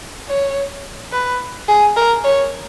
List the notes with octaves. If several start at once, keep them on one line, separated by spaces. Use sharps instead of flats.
C#5
B4
G#4
A#4
C#5